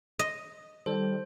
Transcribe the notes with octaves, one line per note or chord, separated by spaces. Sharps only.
D#5
D#3 G3 A4 C5